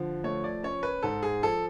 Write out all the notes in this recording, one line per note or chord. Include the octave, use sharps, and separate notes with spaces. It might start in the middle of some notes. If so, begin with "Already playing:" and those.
Already playing: D3 F3
A3 C#5
D5
C#4 C#5
B4
G#2 A4
G#4
F3 A4